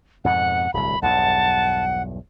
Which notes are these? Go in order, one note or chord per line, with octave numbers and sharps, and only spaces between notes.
F2 G#2 B2 F#5
D1 C2 B5
B1 E2 G2 F#5 A5